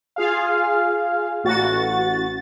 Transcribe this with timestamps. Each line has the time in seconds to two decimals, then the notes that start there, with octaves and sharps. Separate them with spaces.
0.16 F4 G#4 F5
1.44 A1 F#4 A6